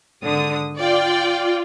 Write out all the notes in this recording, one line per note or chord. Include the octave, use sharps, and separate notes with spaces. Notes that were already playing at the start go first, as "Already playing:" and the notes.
G#1 D3 D#6
F4 D5 G5